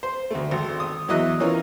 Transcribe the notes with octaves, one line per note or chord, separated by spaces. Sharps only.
C5
D2 A3
G#1
D#6
E2 F#3 E4 D#5 E6 F#6
E3 C#4 F4 A#4 C#5